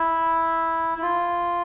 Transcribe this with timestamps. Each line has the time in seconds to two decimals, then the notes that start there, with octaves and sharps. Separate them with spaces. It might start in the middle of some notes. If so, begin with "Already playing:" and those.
Already playing: E4
0.98 E4
1.02 F4